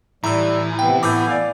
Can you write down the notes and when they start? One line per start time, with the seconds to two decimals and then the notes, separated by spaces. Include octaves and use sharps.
0.24 A2 E3 G3 A#5 E6
0.79 C3 B3 G5
1.03 A2 B3 G#5 D6 E6 G6
1.28 D5 F5